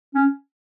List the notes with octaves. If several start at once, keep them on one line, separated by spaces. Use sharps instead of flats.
C#4